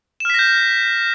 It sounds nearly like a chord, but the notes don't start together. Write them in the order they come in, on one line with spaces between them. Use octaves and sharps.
E7 F6 B6 A#6 G6